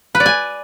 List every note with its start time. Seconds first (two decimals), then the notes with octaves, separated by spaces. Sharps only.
0.15 B4
0.20 D5
0.26 G#5